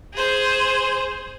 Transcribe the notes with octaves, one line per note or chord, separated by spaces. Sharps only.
G#4 C5